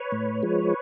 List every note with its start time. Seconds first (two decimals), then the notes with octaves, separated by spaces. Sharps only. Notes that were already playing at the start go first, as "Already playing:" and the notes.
Already playing: B4 C#5
0.12 A2
0.43 F3 G#3